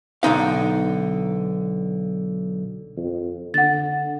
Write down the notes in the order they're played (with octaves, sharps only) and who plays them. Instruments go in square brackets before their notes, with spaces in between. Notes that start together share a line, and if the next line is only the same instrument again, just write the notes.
[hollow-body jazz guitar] B1 D3 D#4 F5
[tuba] F2
[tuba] D3 [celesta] F#5 A6